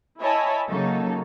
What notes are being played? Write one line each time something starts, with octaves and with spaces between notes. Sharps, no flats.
E4 C#5 D#5 G#5 A5 B5
C#3 F#3 A#3 D#4 A4